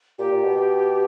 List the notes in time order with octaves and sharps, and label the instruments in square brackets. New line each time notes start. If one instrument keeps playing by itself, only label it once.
[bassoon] A#2 [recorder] G4
[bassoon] A#2
B2
B2